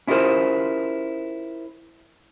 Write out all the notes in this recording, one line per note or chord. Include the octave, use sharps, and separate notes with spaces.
C#4 E4 F4 G4 A#4 C5